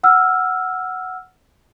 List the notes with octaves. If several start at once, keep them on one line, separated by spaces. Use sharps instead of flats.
F#5 E6 F6